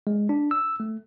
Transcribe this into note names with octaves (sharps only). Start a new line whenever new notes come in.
G#3
D4
E6
A3